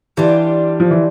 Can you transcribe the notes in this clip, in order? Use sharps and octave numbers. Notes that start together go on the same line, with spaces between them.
E3 G3 D4 F4
F3
E3